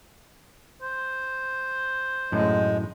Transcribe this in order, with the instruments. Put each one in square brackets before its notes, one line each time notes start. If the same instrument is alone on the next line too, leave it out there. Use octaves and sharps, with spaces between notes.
[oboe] C5
[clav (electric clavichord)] F#2 A2 F#3 [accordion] G#3